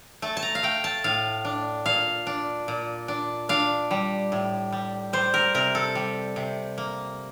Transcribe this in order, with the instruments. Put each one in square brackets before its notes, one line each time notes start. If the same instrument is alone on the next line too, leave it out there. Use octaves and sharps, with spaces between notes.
[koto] A3 A5
A5
A#5
F5
A3 G5
A5
A2 F5
D4
A#2 F5
D4
A#2
D4
D4 F5
G3
A2
G3
G3 C5
A#4
C3 A#4
A4
G3
C3
A#3